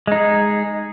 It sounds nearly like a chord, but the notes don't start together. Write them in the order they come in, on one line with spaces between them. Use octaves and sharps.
G#3 D#4 G#4